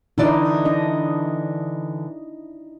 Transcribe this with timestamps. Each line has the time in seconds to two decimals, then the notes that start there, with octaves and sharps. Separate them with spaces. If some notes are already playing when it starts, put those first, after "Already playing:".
0.18 D3 E3 D#4 E4 D5
0.65 D4 D#5